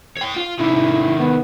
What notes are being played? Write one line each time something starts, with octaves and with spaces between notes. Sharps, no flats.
C#5 G5
F4
C3 D#3 E4
B3